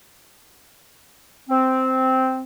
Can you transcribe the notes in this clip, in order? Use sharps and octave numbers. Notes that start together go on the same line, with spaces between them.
C4